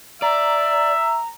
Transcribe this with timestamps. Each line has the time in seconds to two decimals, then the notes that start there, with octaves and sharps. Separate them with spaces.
0.22 D5 E5 A#5